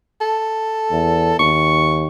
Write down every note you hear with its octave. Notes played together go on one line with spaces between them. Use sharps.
A4
E2
D#2 C#6